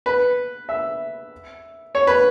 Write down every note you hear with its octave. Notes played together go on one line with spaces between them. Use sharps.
B4
E5
C#5
B4